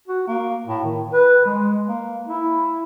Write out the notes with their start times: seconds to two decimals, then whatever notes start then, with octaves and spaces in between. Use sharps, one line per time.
0.08 F#4
0.28 A#3
0.67 A2
0.84 D#3
1.12 B4
1.46 G#3
1.88 A#3
2.28 E4